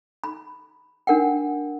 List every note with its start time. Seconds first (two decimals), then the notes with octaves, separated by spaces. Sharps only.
0.24 B5
1.07 D4 A#4 F#5 G5